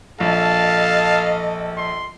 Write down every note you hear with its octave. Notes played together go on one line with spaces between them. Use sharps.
A#1 A4 D#5 F5 A5
C6